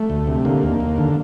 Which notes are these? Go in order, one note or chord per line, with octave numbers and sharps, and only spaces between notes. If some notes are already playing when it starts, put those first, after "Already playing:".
Already playing: A3
D2
C3
D3 A#3
D#2
D#2
D3